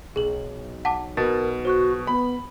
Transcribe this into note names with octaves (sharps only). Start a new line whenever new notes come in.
B1 G#4 F#7
F#5 A5 D6
B2 A#4 A6
F#4 C5 C#6 F#6
B3 B5